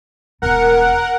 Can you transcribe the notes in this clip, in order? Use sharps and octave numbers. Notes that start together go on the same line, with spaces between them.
E1 B1 A#4 F#5